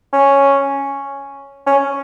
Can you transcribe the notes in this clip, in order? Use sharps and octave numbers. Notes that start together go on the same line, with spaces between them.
C#4
C#4